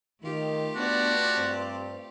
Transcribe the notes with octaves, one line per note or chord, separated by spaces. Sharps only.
D#3 A3 F4 G4
B3 D4 F#4 D5 A5
G2 C4